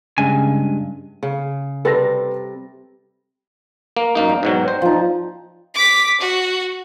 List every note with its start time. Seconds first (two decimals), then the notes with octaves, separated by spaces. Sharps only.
0.18 G2 C#3 G#3 G#5
1.23 C#3
1.85 C3 G3 A4 B4 A#6
3.97 A#3
4.15 F#2 A#3 D#4
4.29 D5 G5
4.43 G#2 B2 F#3
4.68 C5
4.82 F3 D#4
5.75 D6 B6
6.20 F#4